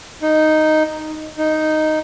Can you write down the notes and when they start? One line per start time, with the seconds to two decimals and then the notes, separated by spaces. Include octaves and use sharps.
0.22 D#4
1.38 D#4